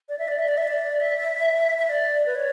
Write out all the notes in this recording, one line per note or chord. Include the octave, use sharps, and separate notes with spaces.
D5
E5
D5
E5
D5
E5
D5
E5
E5
D5
B4
C#5